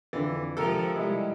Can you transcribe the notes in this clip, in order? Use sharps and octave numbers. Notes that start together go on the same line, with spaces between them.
F2 D3 E3
C3 F3 G#3 A4 A#4
C3 G3 G#3 E4 D#5